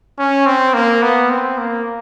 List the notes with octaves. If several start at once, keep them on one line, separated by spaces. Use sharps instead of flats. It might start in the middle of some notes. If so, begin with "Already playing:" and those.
C#4
C4
A#3
B3
C4
A#3